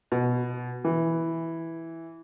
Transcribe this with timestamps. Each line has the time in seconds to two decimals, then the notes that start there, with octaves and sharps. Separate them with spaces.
0.12 B2
0.85 E3